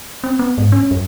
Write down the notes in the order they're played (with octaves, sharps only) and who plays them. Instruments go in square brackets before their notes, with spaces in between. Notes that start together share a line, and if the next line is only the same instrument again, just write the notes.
[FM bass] C4
B3
G#2
C#4
F#2